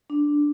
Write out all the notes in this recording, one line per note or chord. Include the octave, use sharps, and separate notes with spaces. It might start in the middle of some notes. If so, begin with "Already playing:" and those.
D4